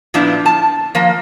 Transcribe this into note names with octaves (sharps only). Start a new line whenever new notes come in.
A#2 F3 B3 D4 E4
A5
F3 A#3